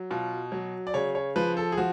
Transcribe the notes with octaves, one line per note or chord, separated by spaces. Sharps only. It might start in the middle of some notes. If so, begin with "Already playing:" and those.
Already playing: F#3
B2 F4
F#3
D5
C#3 C#5
C#5
F3 B4
A4
G#4
F3 F#4